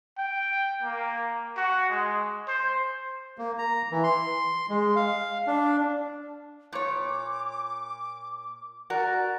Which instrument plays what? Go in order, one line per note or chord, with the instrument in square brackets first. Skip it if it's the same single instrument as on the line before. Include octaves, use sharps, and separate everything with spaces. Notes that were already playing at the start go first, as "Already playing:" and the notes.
[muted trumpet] G5
A#3
F#4
G#3
C5
[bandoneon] A#3
A#5
E3
C6
G#3
F5
D4
[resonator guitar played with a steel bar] A#2 C#5 [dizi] D6
[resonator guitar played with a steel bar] F#4 A#4 [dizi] D5